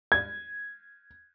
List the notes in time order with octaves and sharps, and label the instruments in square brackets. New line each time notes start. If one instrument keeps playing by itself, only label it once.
[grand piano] G#6